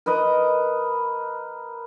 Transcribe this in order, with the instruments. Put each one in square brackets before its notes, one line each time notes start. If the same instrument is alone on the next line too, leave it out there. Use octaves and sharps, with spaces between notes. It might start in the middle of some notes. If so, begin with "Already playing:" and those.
[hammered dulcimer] A#4 B4 D#5